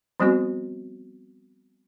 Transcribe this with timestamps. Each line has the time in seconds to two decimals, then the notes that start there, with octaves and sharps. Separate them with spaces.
0.20 F3 G3 B3 C4 F#4